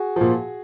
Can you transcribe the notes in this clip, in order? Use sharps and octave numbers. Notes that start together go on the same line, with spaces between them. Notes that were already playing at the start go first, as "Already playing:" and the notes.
Already playing: F#4 G#4
A#2 F3